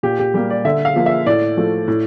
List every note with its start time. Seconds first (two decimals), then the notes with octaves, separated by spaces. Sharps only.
0.03 A#2 G4
0.19 G4
0.34 G3 A#3 G4
0.50 D5
0.65 D3 E5
0.85 F5
0.96 F3 A#3
1.06 E5
1.26 A2 D5
1.57 F3 A3
1.88 A2